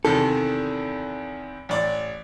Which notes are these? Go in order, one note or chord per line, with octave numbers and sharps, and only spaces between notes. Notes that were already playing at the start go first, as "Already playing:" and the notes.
E2 C3 D#3 A4
A1 D5 D6